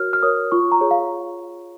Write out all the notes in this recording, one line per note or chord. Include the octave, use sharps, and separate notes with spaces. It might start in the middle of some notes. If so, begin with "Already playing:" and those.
Already playing: F#4 A#4 C#5 F6
F6
A#4 C#5 D#6
F4 C#6
A#5
G#4 C#5
F5